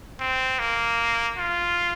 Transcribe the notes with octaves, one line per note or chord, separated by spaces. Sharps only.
C4
A#3
F4